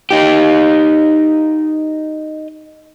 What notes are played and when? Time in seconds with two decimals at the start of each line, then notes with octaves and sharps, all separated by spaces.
0.11 D#4 G4